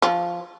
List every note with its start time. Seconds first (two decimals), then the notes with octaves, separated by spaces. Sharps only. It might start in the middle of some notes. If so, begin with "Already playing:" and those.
0.02 F3